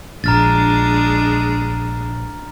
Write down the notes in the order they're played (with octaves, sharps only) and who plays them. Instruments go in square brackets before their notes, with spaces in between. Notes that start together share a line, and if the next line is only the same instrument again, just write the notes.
[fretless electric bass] A#1 [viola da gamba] G#3 D4 [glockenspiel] A#5 F6 A6